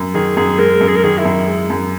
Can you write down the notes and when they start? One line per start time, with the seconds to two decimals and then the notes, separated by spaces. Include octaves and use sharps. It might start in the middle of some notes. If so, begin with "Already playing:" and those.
Already playing: F#2
0.14 D#3 G#4
0.36 F#2 G#4
0.58 G#3 A#4
0.81 F#2
0.88 G#4
0.96 A#4
1.04 D#3 G#4
1.18 E4
1.25 F#2
1.47 G#3
1.70 F#2